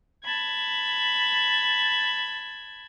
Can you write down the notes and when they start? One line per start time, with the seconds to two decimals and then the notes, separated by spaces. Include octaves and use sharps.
0.23 A5 B5 G#6